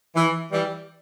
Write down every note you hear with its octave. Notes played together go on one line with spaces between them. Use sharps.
E3
E3 G3